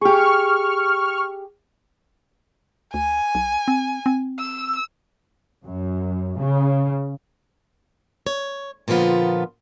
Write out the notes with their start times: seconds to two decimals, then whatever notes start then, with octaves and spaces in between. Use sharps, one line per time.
0.01 G4 G#4 C#6 F6
2.94 D2 G#5
3.35 B1
3.68 C4
4.06 C4
4.39 E6
5.64 F#2
6.37 C#3
8.27 C#5
8.88 A#2 D3 F3 B3 F4